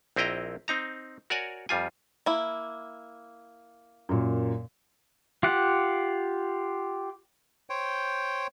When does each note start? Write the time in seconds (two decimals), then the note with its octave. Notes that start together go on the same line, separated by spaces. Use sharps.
0.16 A#1 C4 E4 D#5 G5 A#5
0.68 C4 D#4 A#5
1.30 F#4 A#4 C#5 D5 F#5 G#5
1.69 F2 G3 F4 G#5
2.26 A#3 E4
4.09 F#2 A#2
5.43 F4 G4 F#5
7.70 C5 C#5 G5